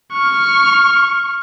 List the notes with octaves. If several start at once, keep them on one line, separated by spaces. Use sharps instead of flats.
C#6 F6